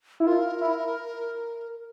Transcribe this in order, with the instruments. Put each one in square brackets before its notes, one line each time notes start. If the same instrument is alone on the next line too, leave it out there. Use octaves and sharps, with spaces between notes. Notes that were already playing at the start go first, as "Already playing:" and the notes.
[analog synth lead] E4
[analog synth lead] F4 [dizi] A#4
[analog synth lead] E4